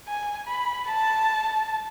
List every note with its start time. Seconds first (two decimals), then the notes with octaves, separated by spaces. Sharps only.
0.08 G#5
0.47 B5
0.87 A5